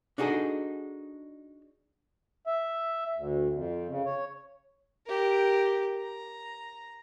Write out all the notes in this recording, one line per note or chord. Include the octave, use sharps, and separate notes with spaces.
D4 D#4 F#4 G#4 A4 D#5
E5
D2
F2
C#3
C#5
G4 A#4
A#5